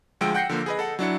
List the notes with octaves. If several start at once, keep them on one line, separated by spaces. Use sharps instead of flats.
D2 F3 G#3 G5 E6 D7
F#5 G5 G6 A#6 C7 C#7
D3 F3 A#3
G#4 B4 D#5
A4 F#5
F#3 D4 E4 C#7